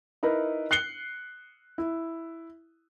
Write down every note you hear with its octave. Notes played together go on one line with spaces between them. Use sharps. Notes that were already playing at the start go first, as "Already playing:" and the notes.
D#4 E4 A#4 B4
F#6 C7 C#7 G7
E4